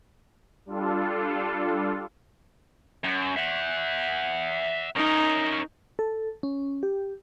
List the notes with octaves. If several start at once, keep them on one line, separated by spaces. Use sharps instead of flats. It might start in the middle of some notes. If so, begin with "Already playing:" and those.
G3 D4 F4 A4
F#2
E5 F#5
C#4 D#4 A#4
A4
C#4
G4